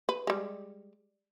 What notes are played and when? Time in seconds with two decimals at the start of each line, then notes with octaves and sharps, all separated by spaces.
0.09 B4
0.27 G3 G#3